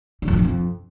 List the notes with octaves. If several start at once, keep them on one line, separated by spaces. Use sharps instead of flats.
D3
F2
F3
G#2
F2